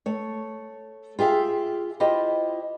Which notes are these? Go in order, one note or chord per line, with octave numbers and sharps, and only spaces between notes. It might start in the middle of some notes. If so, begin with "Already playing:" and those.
A3 C#5
F4 G4 G#4 E5 F5
E4 F4 G4 C5 D#5